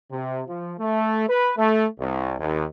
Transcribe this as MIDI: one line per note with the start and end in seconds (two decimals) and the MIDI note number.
0.10 0.42 48
0.48 0.73 53
0.78 1.28 57
1.29 1.52 71
1.57 1.86 57
1.99 2.35 36
2.40 2.65 39